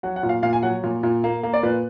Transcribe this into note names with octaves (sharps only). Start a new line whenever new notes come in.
F#3 F#5
F#5
A#2
F5
A#2 F5
G#5
F#3 F#5
A#2
A#2
A#3
A#3
D5
A#2 B4